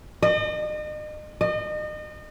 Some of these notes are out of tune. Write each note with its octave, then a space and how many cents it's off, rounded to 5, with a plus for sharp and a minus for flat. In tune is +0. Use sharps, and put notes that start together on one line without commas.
D#5 -40
D#5 -35